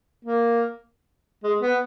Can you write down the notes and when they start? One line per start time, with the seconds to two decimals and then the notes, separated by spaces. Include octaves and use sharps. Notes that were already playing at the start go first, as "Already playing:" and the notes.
0.25 A#3
1.43 G#3
1.62 B3